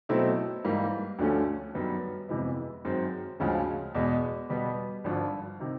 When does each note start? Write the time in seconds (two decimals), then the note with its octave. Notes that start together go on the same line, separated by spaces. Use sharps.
0.09 B2 F#3 A3 C4 E4
0.64 G#2 E3 G3 A#3
1.19 D2 D3 F3 A3 C#4
1.74 F#2 D#3 G3 B3
2.29 F2 C3 E3 G#3 B3
2.84 F#2 D#3 G#3 C4
3.40 D2 C#3 F3 G#3 C#4
3.95 E2 B2 G#3
4.50 B2 G3 B3
5.04 G#1 G2 D3 F3
5.60 C3 D#3